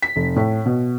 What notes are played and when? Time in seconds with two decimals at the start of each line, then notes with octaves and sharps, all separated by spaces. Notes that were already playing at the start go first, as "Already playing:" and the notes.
0.02 B6
0.16 F1
0.36 A2
0.66 B2